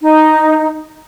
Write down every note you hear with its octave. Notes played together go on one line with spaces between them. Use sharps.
D#4